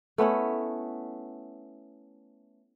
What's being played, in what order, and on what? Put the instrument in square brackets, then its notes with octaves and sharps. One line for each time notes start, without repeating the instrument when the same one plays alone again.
[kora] A3 B3 C#4 E4